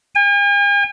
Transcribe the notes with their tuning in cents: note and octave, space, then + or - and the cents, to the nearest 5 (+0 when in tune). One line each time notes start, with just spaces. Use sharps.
G#5 -45